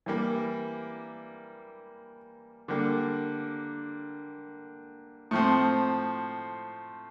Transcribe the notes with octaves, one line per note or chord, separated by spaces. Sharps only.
E3 G3 A#3
D3 G3 A#3
A2 F3 C4